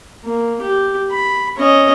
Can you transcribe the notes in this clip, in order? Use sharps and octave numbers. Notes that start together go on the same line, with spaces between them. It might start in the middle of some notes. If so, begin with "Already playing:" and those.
A#3
G4
B5
C#4 D#5